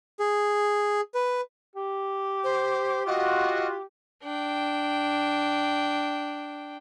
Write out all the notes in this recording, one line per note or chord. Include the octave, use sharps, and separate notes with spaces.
G#4
B4
G4
C5
F4 F#4 D#5
D4 G5